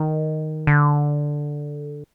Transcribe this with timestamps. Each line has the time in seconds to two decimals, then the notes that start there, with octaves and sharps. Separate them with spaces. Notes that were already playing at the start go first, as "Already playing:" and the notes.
Already playing: D#3
0.67 D3